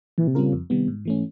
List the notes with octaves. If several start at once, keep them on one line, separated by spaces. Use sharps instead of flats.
A#2 E3
C3
C#3 G3 C4 F4 A#4
F2
C3 D#3 G3 B3
G#2
E3 A3 C#4